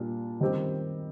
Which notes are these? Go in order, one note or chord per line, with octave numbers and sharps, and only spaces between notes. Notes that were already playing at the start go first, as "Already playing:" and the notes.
Already playing: A#2 G3 D4 F4
D#3 G3 C4 G4